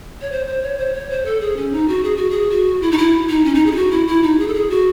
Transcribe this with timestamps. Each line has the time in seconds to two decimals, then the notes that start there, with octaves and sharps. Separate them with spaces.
0.21 C#5
0.32 C5
0.46 C5
0.62 C#5
0.79 C5
0.94 C#5
1.10 C5
1.25 A4
1.41 G#4
1.57 C#4
1.72 D#4
1.88 F#4
2.04 G#4
2.16 F#4
2.31 G#4
2.50 F#4
2.82 E4
2.91 D#4
2.98 E4
3.29 D#4
3.45 C#4
3.55 D#4
3.66 G#4
3.72 E4
3.76 F#4
3.91 E4
4.07 E4
4.23 D#4
4.39 G#4
4.47 A4
4.54 G#4
4.70 F#4